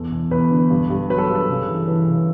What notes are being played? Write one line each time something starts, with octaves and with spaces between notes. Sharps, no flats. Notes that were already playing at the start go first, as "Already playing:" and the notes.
Already playing: E2 A4
E2
E2 B4
D3
G2
G2
F#3 B4
A4
G2
A4
C#3
E3
E3 B4
C#3